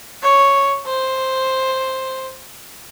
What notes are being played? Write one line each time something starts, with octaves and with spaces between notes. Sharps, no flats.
C#5
C5